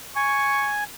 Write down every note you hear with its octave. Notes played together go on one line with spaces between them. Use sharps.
G#5 C#6